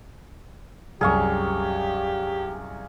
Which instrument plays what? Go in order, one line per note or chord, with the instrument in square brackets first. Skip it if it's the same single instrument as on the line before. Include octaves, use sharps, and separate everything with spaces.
[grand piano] C2 F#2 [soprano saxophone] G4 [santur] G#4 F5 C#6